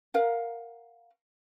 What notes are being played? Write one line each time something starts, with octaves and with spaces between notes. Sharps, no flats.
A#4 F5 F#5